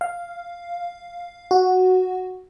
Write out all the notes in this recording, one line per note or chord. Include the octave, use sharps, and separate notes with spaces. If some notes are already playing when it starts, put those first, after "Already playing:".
F5
F#4